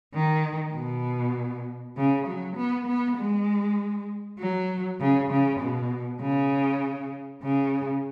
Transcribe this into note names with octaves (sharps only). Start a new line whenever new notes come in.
D#3
B2
C#3
F#3
B3
B3
G#3
F#3
C#3
C#3
B2
C#3
C#3